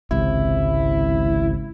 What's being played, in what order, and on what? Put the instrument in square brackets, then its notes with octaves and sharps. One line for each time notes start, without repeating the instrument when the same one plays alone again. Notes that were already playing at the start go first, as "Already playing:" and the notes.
[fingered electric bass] G#1 C#2 C3 [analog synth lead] E4